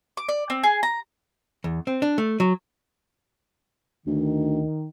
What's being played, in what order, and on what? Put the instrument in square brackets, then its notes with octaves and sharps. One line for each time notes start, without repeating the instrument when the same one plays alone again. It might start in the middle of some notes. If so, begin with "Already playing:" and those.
[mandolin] D6
D5
C4
G#4
A#5
[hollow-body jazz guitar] E2
C4
D4
A3
F#3
[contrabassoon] D2 [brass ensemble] D#3